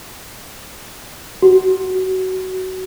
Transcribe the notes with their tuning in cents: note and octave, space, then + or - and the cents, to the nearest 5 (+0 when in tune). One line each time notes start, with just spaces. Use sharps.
F#4 +20